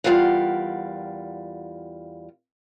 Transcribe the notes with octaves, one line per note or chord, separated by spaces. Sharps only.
E2 G3 F4 A#4 F5 F#5